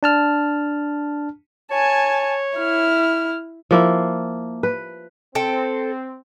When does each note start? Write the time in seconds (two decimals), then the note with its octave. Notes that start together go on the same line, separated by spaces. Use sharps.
0.03 D4 A5 F6
1.71 C#5 G#5 A5
2.58 E4 F6
3.71 F3 A#3 E4
4.63 B4
5.35 C4 A4 G5